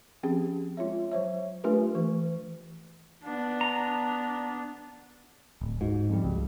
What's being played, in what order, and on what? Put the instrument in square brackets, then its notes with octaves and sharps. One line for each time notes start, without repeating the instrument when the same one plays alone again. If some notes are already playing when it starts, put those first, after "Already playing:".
[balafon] F3 C4 C#4 G4 G#4
G#3 F4 C#5 E5
F#3 C5 C#5 E5
A3 D4 F4 G4 A#4 B4
E3 A3
[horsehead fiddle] B3 D4
[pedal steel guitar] A#5
[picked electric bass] D1
[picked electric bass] G#2 [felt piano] F#4
[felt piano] F2 G3
[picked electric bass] C#2